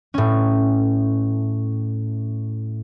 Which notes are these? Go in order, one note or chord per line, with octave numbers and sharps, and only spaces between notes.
A2 C#4